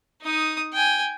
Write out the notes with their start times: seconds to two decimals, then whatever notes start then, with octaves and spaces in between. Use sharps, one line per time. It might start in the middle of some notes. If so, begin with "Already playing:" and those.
0.22 D#4 D#6
0.73 G5 G#5